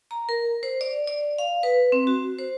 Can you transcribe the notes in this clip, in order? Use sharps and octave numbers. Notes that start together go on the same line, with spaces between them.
A#5
A#4
C5
D5
D5
F5
B4
C4
F#4
C5